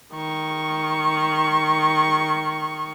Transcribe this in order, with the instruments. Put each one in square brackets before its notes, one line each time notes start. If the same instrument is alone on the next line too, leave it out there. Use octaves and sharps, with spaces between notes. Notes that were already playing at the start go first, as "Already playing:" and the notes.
[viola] D#3 C#6